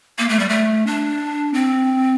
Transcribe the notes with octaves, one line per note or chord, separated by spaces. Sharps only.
A#3
A3
G3
A3
D4
C4